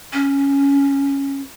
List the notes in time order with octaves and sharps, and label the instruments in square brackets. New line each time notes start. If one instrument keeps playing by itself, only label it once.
[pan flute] C#4